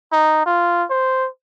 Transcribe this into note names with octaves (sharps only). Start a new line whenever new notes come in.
D#4
F4
C5